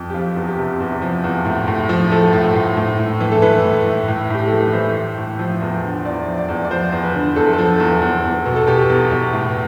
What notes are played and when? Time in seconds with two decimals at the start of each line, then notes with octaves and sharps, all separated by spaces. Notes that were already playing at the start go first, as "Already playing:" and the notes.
Already playing: F2
0.10 G4
0.14 F3 F4
0.36 E2
0.47 G4
0.58 C3
0.80 E2
1.02 F3
1.24 E2
1.45 A2
1.68 A2
1.89 F3
2.11 F3 A4
2.33 A2
2.55 A2
2.77 A2
2.99 A2
3.20 E3
3.32 A4
3.42 E3 B4
3.64 A2
3.86 A2
4.08 A2
4.30 A2 G4
4.47 E3 A4
4.60 B4
4.73 E3 C5
4.96 A2
5.18 A2
5.39 F3
5.61 E2
5.83 D3
6.05 E2 D5
6.26 F3
6.38 D5
6.49 E2
6.64 D5
6.71 F3 C5
6.92 E2
7.03 B4
7.15 D3
7.36 E2 A4
7.45 B4
7.53 A4
7.58 F3
7.80 E2
8.02 E2
8.23 E2
8.46 B2
8.56 A4
8.67 B2 G4
8.90 E2
9.11 E2
9.33 A2